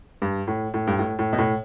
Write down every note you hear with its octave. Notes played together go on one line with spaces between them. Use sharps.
G2
A2
A2
G2
A2
A2
B2
A2